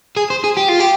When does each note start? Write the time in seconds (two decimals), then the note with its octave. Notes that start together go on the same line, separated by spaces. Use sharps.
0.17 G#4
0.30 C5
0.44 G#4
0.57 G4
0.69 F4
0.80 G4